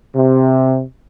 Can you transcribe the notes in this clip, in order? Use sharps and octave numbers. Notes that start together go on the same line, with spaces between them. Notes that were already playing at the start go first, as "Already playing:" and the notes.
C3